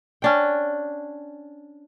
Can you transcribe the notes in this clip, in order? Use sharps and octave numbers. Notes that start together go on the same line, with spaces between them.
C#4 D4 G5